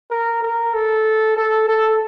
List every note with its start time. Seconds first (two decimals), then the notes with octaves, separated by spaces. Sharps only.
0.11 A#4
0.42 A#4
0.74 A4
1.37 A4
1.68 A4